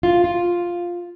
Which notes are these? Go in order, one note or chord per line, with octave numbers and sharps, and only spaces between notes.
F4
F4